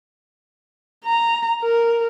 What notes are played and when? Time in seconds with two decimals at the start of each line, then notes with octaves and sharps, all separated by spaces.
1.05 A#5
1.62 A#4